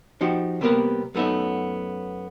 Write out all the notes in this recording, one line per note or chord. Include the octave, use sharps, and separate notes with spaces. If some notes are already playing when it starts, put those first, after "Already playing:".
F3 D#4 F#4 G4
C3 G3 A#3 B3 A#4 B4
F#2 A3 B3 D#4 E5